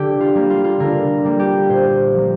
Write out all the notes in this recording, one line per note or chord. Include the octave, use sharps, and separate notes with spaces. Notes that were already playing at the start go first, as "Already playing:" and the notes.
Already playing: D3 G4
F4
G3 A#3
F4
F4
D3 A#4
G3 A#3
G4
A#2 C5
F3 A#3